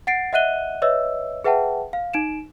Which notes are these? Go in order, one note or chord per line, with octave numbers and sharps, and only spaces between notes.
F#5 A6 C7 D7
D#5 E5 F#5 F#6 D#7 G7
B4 C#5 D#5 E5 E6
G#4 B4 E5 F#5 G5 A5
F5
D#4 D7 E7